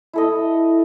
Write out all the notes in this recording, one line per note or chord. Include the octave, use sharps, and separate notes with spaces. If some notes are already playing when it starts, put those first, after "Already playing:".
E4 A4 D#5